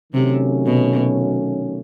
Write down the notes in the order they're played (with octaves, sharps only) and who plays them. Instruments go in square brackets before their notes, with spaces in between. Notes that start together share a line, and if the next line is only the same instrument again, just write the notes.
[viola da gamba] C3 [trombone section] D#3 F#3 A3 C#4
[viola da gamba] B2